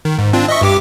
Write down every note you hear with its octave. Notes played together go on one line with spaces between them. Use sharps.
D#3
G#2
C4 D4 F4
D#5 E5 C#6
G2 G4 D6